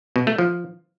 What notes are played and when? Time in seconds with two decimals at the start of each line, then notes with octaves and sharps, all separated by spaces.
0.16 B2
0.27 A3
0.38 F3